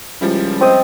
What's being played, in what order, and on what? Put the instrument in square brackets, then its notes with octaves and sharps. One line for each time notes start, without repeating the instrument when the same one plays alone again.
[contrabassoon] C#2 [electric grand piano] F3 G3 E4
[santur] C4 D#5 [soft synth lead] C5